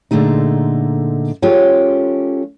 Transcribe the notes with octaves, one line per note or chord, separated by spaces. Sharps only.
A#2 D3 G#3 A3 D#4
G#3 C#4 F4 G4 A4 C#5